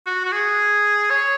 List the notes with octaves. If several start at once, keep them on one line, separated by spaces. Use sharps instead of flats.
F#4
F#4
G#4
C#5